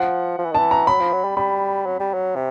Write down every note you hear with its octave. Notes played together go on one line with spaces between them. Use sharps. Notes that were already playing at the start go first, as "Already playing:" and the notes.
Already playing: F3 F#5
F3
E3
D#3
A5
E3
A#5
F#3 B5
F3
F#3
G3
G3 B5
F#3
G3
F#3
C3